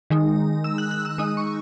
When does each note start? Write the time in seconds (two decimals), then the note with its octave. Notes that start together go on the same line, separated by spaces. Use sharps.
0.10 D#3 G#3 D#4
0.64 E6
0.78 F#6
0.91 F#6
1.05 E6
1.18 G#3 D#4 D#6
1.37 C#6